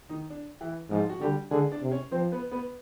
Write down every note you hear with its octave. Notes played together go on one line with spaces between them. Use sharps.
D#3 D#4
D4
E3 E4
G#2 F3 F4
F#4
D3 G3 G4
D3 G#3 G#4
D4 D5
C3
C#4 C#5
F3 C4 C5
B3 B4
B3 B4